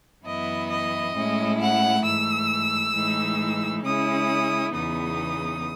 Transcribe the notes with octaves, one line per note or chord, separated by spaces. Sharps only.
F#2 E3 B3 E4 D#5
D#5
A2 G#3 C#4 E4
F#5
G#2 E3 A3 E6
A2 E3 G#3 D#4
C#3 G#3 C#4 E4 D#6
E2 C#3 E3 B3 D#4 D#6